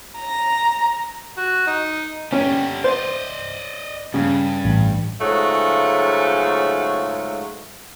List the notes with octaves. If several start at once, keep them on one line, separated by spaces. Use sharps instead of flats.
A#5
F#4
D#4
D3 C#4 G4
C5 D5 D#5
G2 C#3
A1
G#2 C#3 F#3 G#3 A3 F4